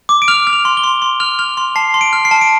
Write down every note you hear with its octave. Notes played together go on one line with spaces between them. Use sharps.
D6
D7
F6 F7
F6
F7
C6
G7
C6
C6
F6 F7
F6 F7
C6
A5 C7
C6
D7
F6
C7
A5
D7